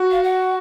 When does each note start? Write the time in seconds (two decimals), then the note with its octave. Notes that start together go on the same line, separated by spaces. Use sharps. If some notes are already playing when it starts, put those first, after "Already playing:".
Already playing: F#4
0.11 F5
0.23 F#5